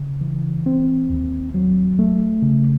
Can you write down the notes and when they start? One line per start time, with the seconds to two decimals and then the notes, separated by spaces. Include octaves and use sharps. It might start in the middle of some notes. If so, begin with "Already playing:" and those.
Already playing: C#3
0.21 E3
0.66 C4
1.10 D#2
1.54 F#3
1.99 A3
2.42 C#3